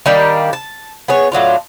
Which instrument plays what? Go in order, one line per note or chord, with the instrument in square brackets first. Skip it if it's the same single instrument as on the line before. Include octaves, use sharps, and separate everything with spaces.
[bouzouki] D#3 G3 A#3 D4
A5
B3 G#4 C#5
A2 F#3 D4 F4